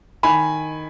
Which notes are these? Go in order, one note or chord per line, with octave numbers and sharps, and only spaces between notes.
D#3 G#5 B5